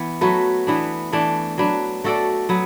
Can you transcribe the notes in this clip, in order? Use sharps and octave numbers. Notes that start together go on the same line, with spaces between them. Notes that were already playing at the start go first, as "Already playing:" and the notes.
Already playing: E3 B3
F#3 A3 F#4 B4
E3 B3 D4
E3 A3 D4
F#3 D4 B4
A3 F#4 A4 D5
F#3 B3